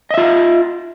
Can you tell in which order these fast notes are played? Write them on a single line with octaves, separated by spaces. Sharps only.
D#5 E5 F4